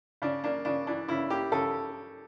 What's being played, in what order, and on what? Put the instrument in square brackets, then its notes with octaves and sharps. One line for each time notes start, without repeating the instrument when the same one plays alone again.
[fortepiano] C#3 D4
A#3 D4
C#3 D4
E3 D4
C#3 E4
A#3 G4
C#3 A4